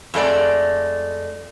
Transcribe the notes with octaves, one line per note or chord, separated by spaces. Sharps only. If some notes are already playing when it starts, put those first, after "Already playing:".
F2 G#3 A3 D5